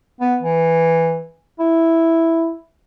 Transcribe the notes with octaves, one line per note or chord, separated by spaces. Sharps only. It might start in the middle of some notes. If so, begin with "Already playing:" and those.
B3
E3
E4